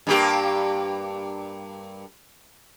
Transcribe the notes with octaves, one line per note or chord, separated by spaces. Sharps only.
G2 A#3 G4